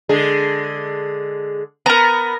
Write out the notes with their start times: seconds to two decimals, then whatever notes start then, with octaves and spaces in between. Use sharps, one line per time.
0.09 D3 G#3 G#4
1.86 B3 A#4 A#5